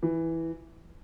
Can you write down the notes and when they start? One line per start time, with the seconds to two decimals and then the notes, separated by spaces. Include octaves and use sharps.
0.03 E3